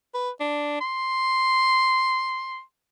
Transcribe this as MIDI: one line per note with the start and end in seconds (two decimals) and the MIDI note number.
0.14 0.30 71
0.40 0.79 62
0.81 2.61 84